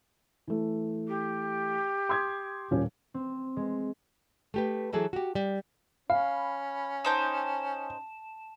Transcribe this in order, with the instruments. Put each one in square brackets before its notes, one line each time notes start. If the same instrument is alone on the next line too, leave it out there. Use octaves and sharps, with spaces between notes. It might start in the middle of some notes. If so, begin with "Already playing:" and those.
[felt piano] E3 A3
[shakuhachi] G4
[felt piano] C6 D#6 G#6
D#1 A#2 C#4
[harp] C4
G#3
[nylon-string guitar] A3 G4 B4
E3 F#3 E4 G#4 A4
F#4 G4
G3
[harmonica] C#4 [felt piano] F5 [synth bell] B5
[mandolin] D#4 C5 G5 [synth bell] A5 E7